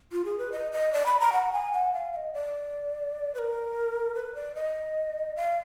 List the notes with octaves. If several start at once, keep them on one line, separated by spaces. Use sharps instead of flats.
F4
G#4
B4
D#5
D#5
D5
B5
A#5
F#5
G#5
F#5
F5
F5
D#5
D5
B4
A#4
B4
D5
D#5
F5